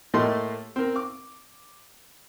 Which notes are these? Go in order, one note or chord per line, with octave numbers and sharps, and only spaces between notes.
A2 A3 A#3 G4 D#5 C6
C4 A#4
D6